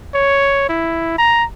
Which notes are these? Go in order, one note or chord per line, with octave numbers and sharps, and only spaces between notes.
C#5
E4
A#5